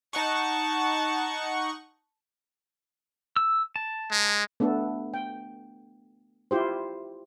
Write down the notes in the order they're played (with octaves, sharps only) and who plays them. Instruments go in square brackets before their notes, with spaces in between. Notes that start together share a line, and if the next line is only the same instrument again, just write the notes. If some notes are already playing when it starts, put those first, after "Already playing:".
[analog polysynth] D#4 F#5 C#6 [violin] A5
[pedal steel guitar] E6
A5
[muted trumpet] G#3
[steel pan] A3 B3 D4 A4
G5
E4 F4 G4 C5